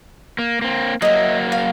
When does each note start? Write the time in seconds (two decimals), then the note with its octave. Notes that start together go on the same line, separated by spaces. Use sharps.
0.39 A#3
0.62 A#3 C4
1.02 F#3 A#3 D#5 E5
1.52 F5